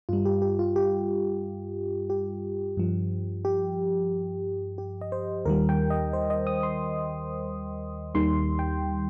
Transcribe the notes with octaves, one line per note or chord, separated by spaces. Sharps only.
G2 G3 F4
G4
G4
F4
G4
G4
G2 F3
G4
G4
D#5
C5
D#2 D#3 G3 A#4
G5
D#5
C5
D#5
D#6
C6
D#2 D#3 G3 C6
G5